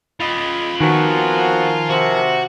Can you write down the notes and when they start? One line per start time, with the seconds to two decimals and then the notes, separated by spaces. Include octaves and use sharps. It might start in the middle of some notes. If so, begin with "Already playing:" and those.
0.20 F4 D#5 B5
0.81 D#3 F3 B3 C4 F#4 A#4 G#5
1.89 C3 F#4